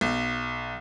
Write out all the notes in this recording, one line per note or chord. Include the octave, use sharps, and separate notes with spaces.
B1